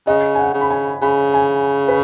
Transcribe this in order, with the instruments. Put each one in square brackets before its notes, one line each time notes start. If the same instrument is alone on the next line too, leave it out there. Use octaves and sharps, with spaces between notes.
[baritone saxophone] C#3 [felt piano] D#5
[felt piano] G#5
F#5
[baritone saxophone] C#3
[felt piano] B5
G#5
[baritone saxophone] C#3 [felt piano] B5
[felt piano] G#5
B4